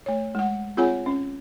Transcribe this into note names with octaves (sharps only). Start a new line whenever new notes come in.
A3 C#5
G#3 F#5
C4 F4 G#4 C#5 F#5 G#5
C#4